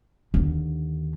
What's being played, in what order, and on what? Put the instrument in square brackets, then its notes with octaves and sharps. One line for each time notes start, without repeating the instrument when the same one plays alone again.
[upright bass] D#2 D3